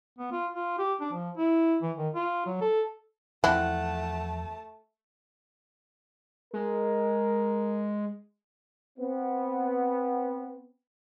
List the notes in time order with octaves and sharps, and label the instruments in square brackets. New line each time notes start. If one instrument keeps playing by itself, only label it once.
[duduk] B3
F4
F4
G4
D4
F3
E4
E3
D#3
F4
F#3
A4
[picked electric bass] E2 F3 [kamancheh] A3 A5 [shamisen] C4 E4 [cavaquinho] F#5
[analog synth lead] G#3 [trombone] A#4
[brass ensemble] B3 C4